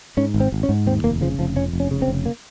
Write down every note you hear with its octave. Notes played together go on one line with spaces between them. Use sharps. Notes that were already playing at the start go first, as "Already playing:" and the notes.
G#2 C#4
G#1
C4
G#1
C#4
G#2
D#2 C4
F1 A#3
C#3 F3
F1 F3
F2 C#4
F1
C#4
C#3
C4
F1
A#3